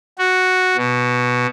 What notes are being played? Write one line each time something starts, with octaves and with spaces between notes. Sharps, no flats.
F#4
B2